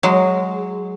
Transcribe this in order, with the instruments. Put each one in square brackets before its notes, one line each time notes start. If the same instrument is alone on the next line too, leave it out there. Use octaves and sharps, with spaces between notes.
[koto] F#3 G#3